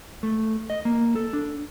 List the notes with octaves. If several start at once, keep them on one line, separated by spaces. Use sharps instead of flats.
A3
D#5
A#3
A4
D4